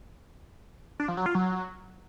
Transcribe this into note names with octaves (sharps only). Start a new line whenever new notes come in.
D4
F3
F#3
F4
F#3